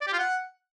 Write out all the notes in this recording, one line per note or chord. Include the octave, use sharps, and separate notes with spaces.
D5
G4
F4
F#5